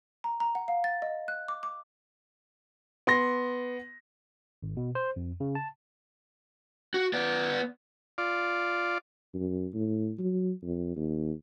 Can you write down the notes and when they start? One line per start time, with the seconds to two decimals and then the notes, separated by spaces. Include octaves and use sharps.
0.24 A#5
0.40 A#5
0.55 F#5
0.68 F5
0.84 A6
1.02 D#5
1.28 F#6
1.48 D6
1.63 D6
3.07 B3 C6 A#6
4.63 G#1
4.77 B2
4.95 C5
5.16 F2
5.40 C#3
5.55 A5
6.94 F#4
7.13 B3 D5
8.18 F4 D5
9.34 F#2
9.74 A2
10.19 F#3
10.63 F2
10.96 D#2